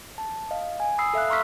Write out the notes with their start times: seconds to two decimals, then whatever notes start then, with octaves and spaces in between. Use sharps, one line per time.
0.18 A5
0.51 D#5 F5
0.80 G#5
0.98 B5 D#6 E6 C7
1.14 A4 E5 F5 F#6
1.30 A#5 C6 C#6 E6 F6 B6